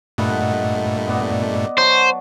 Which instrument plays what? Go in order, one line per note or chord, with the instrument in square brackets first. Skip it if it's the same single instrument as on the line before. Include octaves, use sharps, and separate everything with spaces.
[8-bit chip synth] G2 A#2 A3 [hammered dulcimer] D#5 F#5 B5
[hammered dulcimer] B3 D5 D#5
[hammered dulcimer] F#3 A5 [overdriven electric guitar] C5